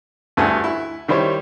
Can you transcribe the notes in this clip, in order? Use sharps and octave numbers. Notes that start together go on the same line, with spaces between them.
D2 G2 A3 E4 F#5 G#5
E4
D#3 G3 E4 C5 C#5